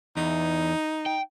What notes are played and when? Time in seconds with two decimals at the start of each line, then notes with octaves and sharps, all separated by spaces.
0.17 E2 D#4
1.06 G5